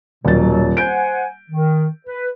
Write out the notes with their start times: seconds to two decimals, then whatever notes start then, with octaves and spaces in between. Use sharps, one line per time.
0.25 D#1 B2 D#3 F#3 A6
0.77 C5 F#5 G#5 G6 D7
1.51 D#3
2.07 B4